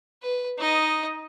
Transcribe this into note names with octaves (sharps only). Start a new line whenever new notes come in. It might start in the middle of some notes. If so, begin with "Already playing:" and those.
B4
D#4 D#5